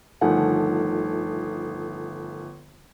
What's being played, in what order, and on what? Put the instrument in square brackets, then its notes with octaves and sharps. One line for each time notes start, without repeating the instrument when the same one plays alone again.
[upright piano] G1 D#3 F3 A3 F#5 G#5